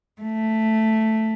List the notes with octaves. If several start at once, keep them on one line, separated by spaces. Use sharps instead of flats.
A3